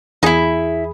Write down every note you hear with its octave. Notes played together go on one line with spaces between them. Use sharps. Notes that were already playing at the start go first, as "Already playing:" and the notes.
E2 D#4 E4 G#4